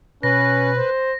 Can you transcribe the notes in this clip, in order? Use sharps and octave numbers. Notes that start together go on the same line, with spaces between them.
B2 C#4 B4 A#6
C5